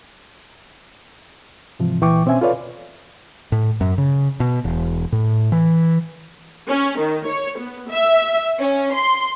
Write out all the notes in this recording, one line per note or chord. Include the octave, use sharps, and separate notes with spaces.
G#2 C3 E3 F3
C2 A#2 E3 G5 C#6 D6
B2 C4 C#4 E5 G#5
F4 A4 B4 C#5 D5 F5
A2
F#2
C#3
B2
E1
A2
E3
C#4
D#3
C#5
B3
E5
C#4
C6